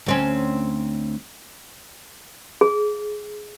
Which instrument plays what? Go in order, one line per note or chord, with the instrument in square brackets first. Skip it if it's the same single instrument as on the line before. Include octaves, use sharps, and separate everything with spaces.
[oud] D2 C4 C#4
[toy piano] G#4